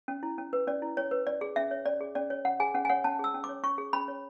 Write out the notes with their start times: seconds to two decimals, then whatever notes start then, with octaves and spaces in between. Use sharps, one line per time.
0.08 C#4
0.23 E4
0.38 C#4
0.53 B4
0.67 C#4 D5
0.82 E4
0.97 C#4 C#5
1.11 B4
1.27 C#4 D5
1.41 G#4
1.56 C#4 E5
1.71 C#5
1.86 C#4 D5
2.01 G#4
2.15 C#4 D5
2.30 C#5
2.45 C#4 F#5
2.60 G#4 G#5
2.75 C#4 F#5
2.85 G#5
2.89 C#5 F#5
3.04 C#4 A5
3.19 G#4 E6
3.34 C#4
3.44 D6
3.49 C#5
3.64 C#4 C#6
3.78 G#4
3.93 C#4 B5
4.08 C#5